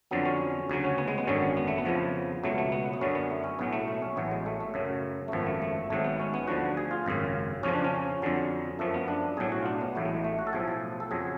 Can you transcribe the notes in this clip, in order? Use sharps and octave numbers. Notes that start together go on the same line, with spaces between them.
F2 D3 F#3 B3
C#4
D2 C#3 F#3
C#4
B3
G#3
B3
G#1 F#2 D3 F#3 C#4
B3
A3
B3
F2 C#3 F3
C#2 B2 F#3 A3
A3
B3
B3
F#2 D3 F#3 C#4
B3
A3
C#4
B1 A2 F#3 B3
A3
A3
C#4
A1 A2 F#3 B3
G#3
A3
A3
F#2 C#3 F#3
A3
G#1 F#2 F3 B3
A3
A3
G#1 G#2 F#3 A3
B3
C#4
B3
D2 D3 F3 F#4
G#4
F4
G#1 F#2 C#3
F2 C#3 F3 C#4
D4
C#4
F2 D3 F#3
F#2 F3 A3
B3
D4
B1 A2 F#3 G#4
F#4
F4
D4
B3
A1 A2 F#3 A3
G#3
A3
A3
F#4
A4
B1 A2 F3 G#4
A4
A4
F2 C#3 F#3 G#4